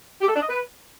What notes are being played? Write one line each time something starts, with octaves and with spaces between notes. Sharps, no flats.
G4
A4
D4
D#5
B4